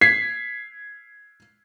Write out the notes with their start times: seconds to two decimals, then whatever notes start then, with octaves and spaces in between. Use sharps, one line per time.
0.01 G#6 B6 C7